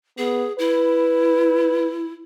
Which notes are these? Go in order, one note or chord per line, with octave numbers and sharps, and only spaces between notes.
B3 G#4
E4 B4